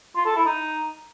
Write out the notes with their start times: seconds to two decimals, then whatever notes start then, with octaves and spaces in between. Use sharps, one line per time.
0.16 F4
0.26 A4
0.36 E4
0.46 D#4